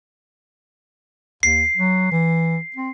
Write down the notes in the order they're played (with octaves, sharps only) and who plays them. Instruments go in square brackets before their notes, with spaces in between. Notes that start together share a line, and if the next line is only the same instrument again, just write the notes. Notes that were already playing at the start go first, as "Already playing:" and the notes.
[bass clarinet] D#2 [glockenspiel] C7
[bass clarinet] F#3
E3
C4